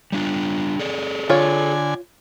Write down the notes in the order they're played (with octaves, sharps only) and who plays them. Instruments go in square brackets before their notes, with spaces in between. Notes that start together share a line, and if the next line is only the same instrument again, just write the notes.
[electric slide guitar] G3 D4 F4
G#4 A4 D5
[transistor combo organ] D3 G#5 [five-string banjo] F4 C#5